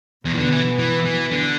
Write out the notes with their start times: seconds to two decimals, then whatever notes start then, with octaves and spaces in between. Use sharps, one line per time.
0.25 E2 B2 B3
0.34 E3
0.38 D3
0.52 E3
0.78 E3
1.06 E3
1.32 D3